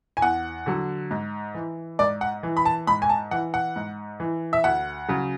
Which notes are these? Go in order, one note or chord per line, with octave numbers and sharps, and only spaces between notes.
G#5
E2 F#5
D3 F#3
G#2
E3
G#2 D5
F#5
E3
B5
A5
G#2 B5
G#5
A5
E3 F#5
F#5
G#2
E3
E5
D2 F#5
C#3 F#3